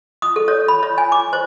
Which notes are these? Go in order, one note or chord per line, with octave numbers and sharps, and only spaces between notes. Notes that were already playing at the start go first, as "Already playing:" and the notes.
D#6
A4
C#5
B5
C#5
G#5
D6
C5